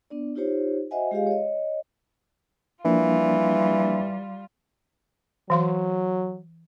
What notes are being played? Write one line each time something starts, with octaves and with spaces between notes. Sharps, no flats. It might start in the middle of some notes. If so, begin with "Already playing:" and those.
B3 D4 D5
D#4 F4 G4 C5 C#5
F#4 C5 D#5 E5 F#5 G#5
G#3 F4 G4 G#4 D#5 F5
C#5 D#5
E3 F3 G3 A#3 D4 F4
E3 F#3 F5 C6